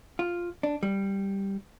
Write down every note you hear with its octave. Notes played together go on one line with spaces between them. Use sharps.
F4
D4
G3